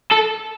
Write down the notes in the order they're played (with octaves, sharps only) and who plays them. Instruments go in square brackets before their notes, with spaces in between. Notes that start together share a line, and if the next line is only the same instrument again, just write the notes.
[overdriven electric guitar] A4